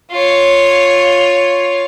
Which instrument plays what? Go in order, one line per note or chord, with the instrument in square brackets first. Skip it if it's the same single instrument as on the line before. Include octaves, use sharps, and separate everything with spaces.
[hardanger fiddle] F4 C#5